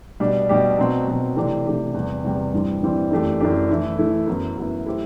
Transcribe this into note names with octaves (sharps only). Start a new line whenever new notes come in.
B2 G3 D4 G4
B2 G3 D4 G4
B2 F#3 C4
B2 F#3 C4
C3 E3 A3 D4 G4
C3 E3 A3 D4 G4
E2 C3 G3
E2 C3 G3
G2 E3 G3 C4
G2 E3 G3 C4
F#2 E3 A3 D4 G4
F#2 E3 A3 D4 G4
E3 A3 E4
E3 A3 E4
F#2 F#3 B3 E4
F#2 F#3 B3 E4
A3 E4 G4 C5